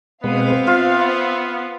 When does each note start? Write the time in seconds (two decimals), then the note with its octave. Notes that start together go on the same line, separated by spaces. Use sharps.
0.24 B2 G#3 B3 C4 B4 C5 F5
0.67 F4 E5